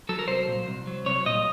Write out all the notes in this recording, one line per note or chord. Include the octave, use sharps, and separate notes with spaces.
F#3 A4
A#4
C2 C5
A#2
C2
F#3
C2 C#5
A#2 D#5